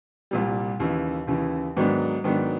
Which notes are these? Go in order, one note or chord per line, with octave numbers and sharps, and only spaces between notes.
C2 A#2 G3
D#2 C#3 E3
D#2 C#3 E3
G#2 D#3 F#3 B3 D4
G#2 D#3 F#3 B3 D4